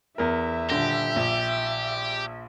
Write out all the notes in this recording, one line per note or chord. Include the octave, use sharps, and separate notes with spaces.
E2 A#4 E5
D#1 D3 G4 A#6
A#1